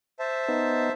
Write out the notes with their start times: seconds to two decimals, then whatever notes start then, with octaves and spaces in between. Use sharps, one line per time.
0.19 C5 E5 A5
0.48 B3 D#4